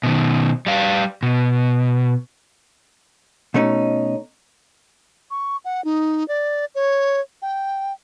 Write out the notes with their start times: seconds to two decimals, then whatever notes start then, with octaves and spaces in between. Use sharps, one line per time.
0.03 B2 D#3
0.67 G3 F5
1.23 B2
3.54 B2 A3 C#4 D#4
5.30 C#6
5.65 F#5
5.85 D#4
6.28 D5
6.75 C#5
7.42 G5